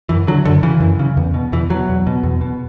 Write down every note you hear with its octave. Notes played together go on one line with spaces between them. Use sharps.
F#2 E3
D3 F#3
F#2 D3
C#3 E3
F#2
C#3
E2
B2
E2 E3
B2 F#3
E2
B2
E2
B2